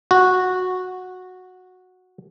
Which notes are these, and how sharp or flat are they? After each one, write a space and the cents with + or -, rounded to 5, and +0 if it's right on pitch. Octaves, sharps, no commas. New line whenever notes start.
F#4 -10